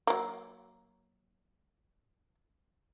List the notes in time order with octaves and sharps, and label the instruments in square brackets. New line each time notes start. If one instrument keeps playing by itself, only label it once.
[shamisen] F#3 A#3